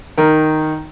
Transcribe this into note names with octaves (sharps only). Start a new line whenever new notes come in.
D#3 A#4